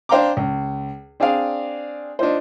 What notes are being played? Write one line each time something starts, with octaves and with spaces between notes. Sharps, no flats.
D4 C5 F5 G5 A#5 D6
C#2
C4 D4 G#4 D5 F5
D4 D#4 F4 C5